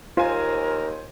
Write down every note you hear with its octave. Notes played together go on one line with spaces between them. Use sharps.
D#2 F4 A#4 C5 G#5